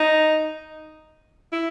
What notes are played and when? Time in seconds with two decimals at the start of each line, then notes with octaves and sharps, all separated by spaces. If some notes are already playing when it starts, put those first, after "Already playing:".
Already playing: D#4
1.53 E4